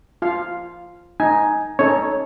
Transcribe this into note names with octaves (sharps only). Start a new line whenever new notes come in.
F4 F5
D#4 G#5
C#4 D#4 A4 C#5